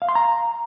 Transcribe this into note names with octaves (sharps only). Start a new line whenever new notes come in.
F5
C6
A#5